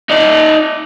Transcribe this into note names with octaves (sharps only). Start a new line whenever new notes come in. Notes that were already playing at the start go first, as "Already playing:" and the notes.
D#4 D5